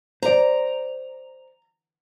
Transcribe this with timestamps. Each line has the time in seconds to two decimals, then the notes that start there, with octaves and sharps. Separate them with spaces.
0.23 C5 D5 A#5